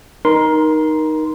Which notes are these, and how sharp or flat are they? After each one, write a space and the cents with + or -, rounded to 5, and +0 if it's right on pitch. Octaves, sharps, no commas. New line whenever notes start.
D#4 +0 A#4 +20 C6 -10